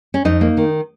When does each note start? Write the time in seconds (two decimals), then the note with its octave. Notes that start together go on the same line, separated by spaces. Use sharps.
0.14 C#4
0.25 F2 D#4
0.41 A#3
0.57 D#3